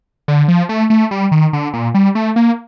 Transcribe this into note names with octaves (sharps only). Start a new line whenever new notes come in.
D3
F3
A3
A3
G3
D#3
D3
A#2
G3
A3
A#3